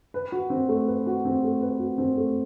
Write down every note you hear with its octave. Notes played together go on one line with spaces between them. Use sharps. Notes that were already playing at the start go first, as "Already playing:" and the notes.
B4
F#4
C4
A3
B4
F#4
C4
A3
B4
F#4
C4
A3